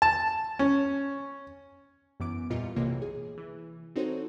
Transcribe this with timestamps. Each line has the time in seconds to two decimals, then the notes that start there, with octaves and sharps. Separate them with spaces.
0.02 A5
0.59 C#4
2.20 F#2 E3 B3 D6 D7
2.50 E2 A#2 G3 F4 D#5 C#7
2.76 B1 C3 E3 A#3 C#5
3.02 G#4
3.38 E3
3.96 C4 D#4 F#4 A4 C5 C#5